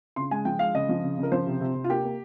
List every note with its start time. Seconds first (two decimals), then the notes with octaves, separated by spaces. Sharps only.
0.16 C#3 C6
0.31 G#3 G#5
0.45 F3 G5
0.59 G#3 F5
0.74 C#3 D#5
0.89 F3
1.03 C#3
1.18 C#3
1.23 A#4
1.32 F3 C5
1.47 C3
1.61 C3
1.75 C3
1.84 F4
1.90 A#3 G4
2.05 A#3